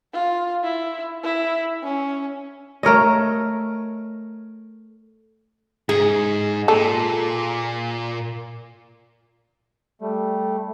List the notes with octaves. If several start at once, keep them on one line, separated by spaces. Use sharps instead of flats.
F4
E4
E4
C#4
A3 A#4 C#5 D#5
G#2 G#4
A#2 A4
G3 A3